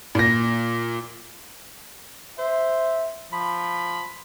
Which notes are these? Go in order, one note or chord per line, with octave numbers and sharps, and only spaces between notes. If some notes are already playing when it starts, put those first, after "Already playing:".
A#2 A#6
C5 E5
F3 B5